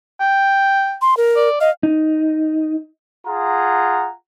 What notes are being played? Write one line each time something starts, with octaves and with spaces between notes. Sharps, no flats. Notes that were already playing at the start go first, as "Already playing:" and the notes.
G5
C6
A#4
D5
D#5 F5
D#4
F4 G#4 F#5 A#5